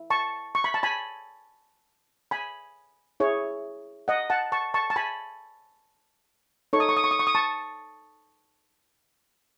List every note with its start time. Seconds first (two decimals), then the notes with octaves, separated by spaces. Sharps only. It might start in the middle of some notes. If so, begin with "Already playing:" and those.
Already playing: E4
0.10 A5 C#6
0.55 C#6
0.64 B5
0.74 A5
0.83 G#5 B5
2.31 G#5 B5
3.20 E4 G#4 C#5
4.08 D#5 F#5
4.30 F#5 A5
4.52 A5 C#6
4.74 A5 C#6
4.90 A5
4.96 G#5 B5
6.73 D#4 A4 C#5 C#6
6.80 D#6
6.89 C#6
6.97 D#6
7.04 C#6
7.11 D#6
7.19 C#6
7.27 D#6
7.35 A5 C#6